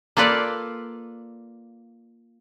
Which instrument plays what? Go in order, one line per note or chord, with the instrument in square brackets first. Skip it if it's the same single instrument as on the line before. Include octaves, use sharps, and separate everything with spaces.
[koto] A#3 F4 A4 B4 D5 F5